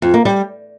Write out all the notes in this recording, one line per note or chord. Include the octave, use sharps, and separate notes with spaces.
F2
A#3
G3